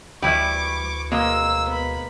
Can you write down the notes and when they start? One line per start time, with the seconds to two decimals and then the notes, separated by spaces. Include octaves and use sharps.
0.22 D2 E3 G3 E4 B4 E5 C#6 D6
1.12 B2 G#3 A#3 E6
1.68 B3 B5